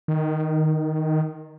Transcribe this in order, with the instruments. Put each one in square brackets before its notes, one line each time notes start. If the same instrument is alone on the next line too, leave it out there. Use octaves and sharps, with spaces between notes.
[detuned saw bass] D#3